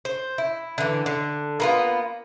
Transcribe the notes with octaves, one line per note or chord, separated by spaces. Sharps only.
C5
E4
D3 E3
D3
A#3 B3 F4